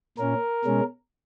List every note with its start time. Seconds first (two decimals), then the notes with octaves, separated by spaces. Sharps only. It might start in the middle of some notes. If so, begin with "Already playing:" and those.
0.18 A#2 A#3 C#4 A#4
0.65 B2 G#3 C#4